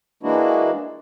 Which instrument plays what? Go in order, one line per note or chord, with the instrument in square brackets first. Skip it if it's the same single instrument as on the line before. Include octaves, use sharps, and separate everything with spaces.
[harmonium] E3 G#3 A#3 D4 E4 F#4